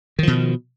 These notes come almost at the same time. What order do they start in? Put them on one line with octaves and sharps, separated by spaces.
D#3 F3 B2